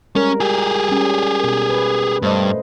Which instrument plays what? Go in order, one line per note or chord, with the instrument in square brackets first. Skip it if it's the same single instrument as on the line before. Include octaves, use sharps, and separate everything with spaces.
[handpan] G3 G#3 A#4 [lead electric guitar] C#4
[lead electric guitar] G4 G#4
[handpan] G3 C#4
B2 A#4
B4
[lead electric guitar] G2 [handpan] A3 C5 D#5